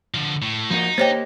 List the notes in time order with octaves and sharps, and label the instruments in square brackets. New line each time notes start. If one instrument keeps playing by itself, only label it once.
[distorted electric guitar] D3 F3
A2
[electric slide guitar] F3 A#3 F#4 [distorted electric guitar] D#4
[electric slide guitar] A#3 G4 D#5 [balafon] C5 C#5 G5